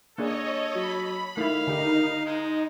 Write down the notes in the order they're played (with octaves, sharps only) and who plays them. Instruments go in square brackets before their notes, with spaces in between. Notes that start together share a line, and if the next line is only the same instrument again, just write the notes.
[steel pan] A#3 D4 G#4 [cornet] A4 [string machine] C#5 D#5
[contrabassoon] F#3 [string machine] B5
[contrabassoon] D#3 [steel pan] A3 E4 [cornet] F5
[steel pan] D3 G4 [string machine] D#4
[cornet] G#3